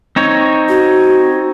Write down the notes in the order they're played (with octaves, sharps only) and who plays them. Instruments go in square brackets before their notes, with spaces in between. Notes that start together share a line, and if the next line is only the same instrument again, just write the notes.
[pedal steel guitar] C4 D#4 C#5
[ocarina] F#4